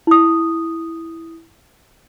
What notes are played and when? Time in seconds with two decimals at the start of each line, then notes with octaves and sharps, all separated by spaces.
0.07 E4 D#6